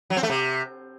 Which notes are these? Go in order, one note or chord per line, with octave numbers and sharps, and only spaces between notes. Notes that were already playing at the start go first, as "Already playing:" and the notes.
F#3
C4
A3
C3